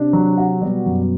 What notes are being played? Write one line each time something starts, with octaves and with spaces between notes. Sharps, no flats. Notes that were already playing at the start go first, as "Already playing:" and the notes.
Already playing: C3 D4
F#3
F#4
B2 G3
F#2